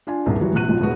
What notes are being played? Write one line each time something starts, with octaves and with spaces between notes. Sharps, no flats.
D4 F4 G#5
D#1 C2 G#4
E3 F#3 G3 F#4
A#1 C3 C4 F#4 F#6 D#7
B1 F2 F3 F#3 F4
E1 A2 G#3 B3 F#4